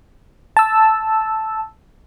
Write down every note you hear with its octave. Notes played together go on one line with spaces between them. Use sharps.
A5 E6